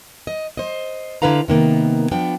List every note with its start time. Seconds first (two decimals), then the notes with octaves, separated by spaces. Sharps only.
0.27 D#5
0.57 C5 D#5
1.22 D3 E4 F4 B4 F5 A#5
1.48 C3 D#3 A#3 B3
2.11 F3 B3 D4 G5